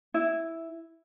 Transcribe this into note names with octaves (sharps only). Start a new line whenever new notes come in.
E4